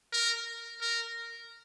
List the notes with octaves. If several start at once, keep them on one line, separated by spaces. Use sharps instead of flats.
A#4
A#4